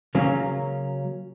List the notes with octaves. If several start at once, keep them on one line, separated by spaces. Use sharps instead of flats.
C#3 F#3 A#3 C#4